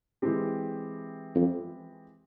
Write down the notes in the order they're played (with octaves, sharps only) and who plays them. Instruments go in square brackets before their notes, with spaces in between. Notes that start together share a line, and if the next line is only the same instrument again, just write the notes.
[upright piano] E3 G#3 C4 G4
[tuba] F2